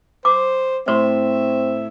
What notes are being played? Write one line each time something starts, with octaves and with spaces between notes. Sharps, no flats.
C5 D6
A2 C4 C5 E5 C6